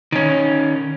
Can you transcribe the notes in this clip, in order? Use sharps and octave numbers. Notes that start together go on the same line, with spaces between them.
D#3 C#4